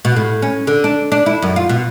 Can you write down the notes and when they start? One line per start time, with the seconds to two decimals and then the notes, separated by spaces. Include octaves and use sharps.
0.05 B2
0.16 A2
0.42 C#4
0.67 D3
0.84 D4
1.12 D4
1.26 E4
1.43 F#2
1.56 F4
1.69 B2